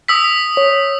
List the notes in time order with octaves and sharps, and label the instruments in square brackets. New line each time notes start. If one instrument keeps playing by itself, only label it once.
[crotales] D#6 E6 B6
[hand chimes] C#5